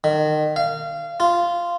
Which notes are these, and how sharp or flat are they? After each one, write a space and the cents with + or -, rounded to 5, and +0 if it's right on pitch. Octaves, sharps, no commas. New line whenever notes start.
D#3 -30
F5 -25
F4 -10